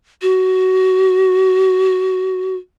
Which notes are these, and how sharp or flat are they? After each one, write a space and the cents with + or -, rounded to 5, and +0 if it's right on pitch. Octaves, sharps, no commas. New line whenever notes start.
F#4 +20